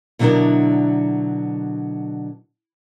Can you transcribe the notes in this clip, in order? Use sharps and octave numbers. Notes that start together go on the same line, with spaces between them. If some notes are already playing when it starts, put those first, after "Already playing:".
B2 D3 F#3 D4 E4 A#4